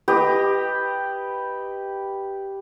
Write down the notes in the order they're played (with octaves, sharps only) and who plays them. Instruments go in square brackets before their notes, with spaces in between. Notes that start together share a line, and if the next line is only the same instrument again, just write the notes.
[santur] G4 B4 D#5